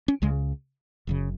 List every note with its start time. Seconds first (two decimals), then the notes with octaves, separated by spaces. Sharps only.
0.08 C#4
0.22 C#2 C#3 G#3
1.07 F#1 F#2 C#3